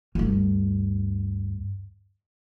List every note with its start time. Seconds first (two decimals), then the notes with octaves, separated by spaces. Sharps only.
0.15 D2 G2